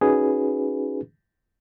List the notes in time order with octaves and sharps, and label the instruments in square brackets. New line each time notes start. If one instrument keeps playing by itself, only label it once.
[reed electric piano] C#4 D#4 F#4 G#4 B4